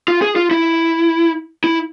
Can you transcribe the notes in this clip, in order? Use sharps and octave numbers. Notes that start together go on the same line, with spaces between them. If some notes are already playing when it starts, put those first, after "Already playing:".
F4
G#4
F4
E4
E4